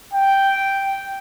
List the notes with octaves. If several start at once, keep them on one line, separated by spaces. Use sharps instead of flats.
G5